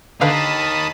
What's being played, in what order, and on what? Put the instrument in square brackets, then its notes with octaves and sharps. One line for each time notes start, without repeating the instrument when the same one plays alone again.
[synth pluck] D3 B4 F5 [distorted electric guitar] D#3 A#3 [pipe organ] A5 B5 D#6